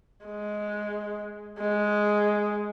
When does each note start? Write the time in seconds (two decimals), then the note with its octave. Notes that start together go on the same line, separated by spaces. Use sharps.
0.25 G#3
1.59 G#3